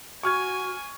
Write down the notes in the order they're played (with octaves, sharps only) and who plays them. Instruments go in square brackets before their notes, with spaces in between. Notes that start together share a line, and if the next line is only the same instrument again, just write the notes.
[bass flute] F#4 [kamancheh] G#5 [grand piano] C#6 F6 G#6